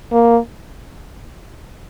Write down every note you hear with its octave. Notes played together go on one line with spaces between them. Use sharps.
A#3